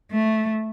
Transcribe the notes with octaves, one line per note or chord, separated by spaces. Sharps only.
A3